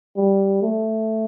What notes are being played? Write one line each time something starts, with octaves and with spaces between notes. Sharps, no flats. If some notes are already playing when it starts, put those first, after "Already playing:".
G3
A3